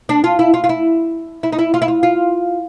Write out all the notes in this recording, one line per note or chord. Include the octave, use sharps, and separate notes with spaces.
D4
F4
E4
F4
F4
E4
E4
D#4
E4
F4
E4
F4
F4